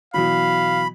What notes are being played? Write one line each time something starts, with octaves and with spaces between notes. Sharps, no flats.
B2 E3 F#3 F5 B5